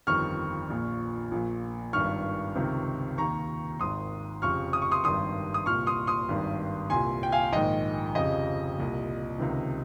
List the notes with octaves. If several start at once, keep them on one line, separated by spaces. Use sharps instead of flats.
G1 F2 D#3 C#6 F6
A#1 A#2
A#1 A#2
G#1 G2 D#3 C#6 F6
C#2 C3 D#3
D#2 D#3 A#5 C#6
G#1 G#2 D#3 C6 D#6
F1 F2 C#3 C#6 F6
D#6
C#6
C6 D#6
G#1 G2 D#3 C6 D#6
D#6
C2 A#2 C#6 F6
C6 D#6
C6 D#6
G#1 G2 D#3
C2 A#2 G#5 C6
G5
F5 G#5
A#1 G#2 D#3 D#5 G5
F1 F2 C#3 D#5
C2 A#2
C#2 C3 D#3